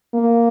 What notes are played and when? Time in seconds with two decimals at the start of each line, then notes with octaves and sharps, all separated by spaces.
0.14 A#3